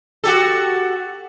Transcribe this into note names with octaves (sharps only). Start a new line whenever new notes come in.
F#4 G4 A4